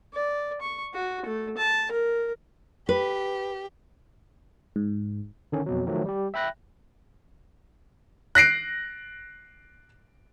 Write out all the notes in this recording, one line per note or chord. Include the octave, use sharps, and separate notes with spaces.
D5
C#6
F#4
A3
A5
A#4
G4 B4
G#2
D3 D#3 C#4
F2 B2 F#3
D#3 F3 F#3 A3
G3 G4
E5 G5 B5 F#6 A#6
F#6 A#6 C7 D7